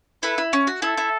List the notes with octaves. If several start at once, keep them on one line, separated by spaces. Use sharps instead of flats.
E4 A4 B4
E4
C#4
F#4
E4 A4
E4